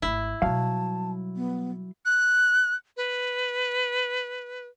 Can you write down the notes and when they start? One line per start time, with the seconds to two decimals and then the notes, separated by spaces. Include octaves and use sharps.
0.02 G#1 A3 E4
0.42 B2 F#3 G3 F5 A5
1.36 B3
2.06 F#6
2.97 B4